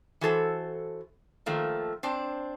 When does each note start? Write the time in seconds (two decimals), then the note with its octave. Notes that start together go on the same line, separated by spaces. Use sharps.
0.21 E3 F#4 A4 C5
1.46 D#3 F3 A3 A#3
2.03 C4 D4 C5